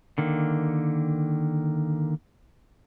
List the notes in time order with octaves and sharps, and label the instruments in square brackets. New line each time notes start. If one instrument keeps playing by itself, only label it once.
[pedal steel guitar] D3 D#3 A#3